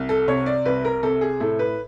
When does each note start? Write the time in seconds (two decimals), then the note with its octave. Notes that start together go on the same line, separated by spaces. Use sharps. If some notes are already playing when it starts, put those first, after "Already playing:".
Already playing: C2
0.09 A4
0.28 C3 C#5
0.46 D5
0.66 C2 B4
0.85 A#4
1.03 C3 A4
1.21 G#4
1.40 A2 A4
1.59 B4